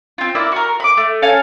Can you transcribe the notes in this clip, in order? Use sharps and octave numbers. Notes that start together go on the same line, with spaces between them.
C4 F4
A#3 E4 D5 E5
F#4 A#4
B5 D6
A3
C#4 A4 F5 G#5